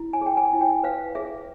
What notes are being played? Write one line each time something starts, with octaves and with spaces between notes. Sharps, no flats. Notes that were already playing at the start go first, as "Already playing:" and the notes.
Already playing: E4
G#5
G#4 G5
G#5
E4
G5
B4 F5
G#4 E5